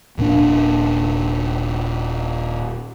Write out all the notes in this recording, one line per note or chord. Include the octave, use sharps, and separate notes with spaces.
D#1 A#2 B3 D4